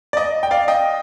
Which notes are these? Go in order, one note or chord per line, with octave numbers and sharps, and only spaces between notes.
D5
D#5
G5
D5 F5
D#5 G5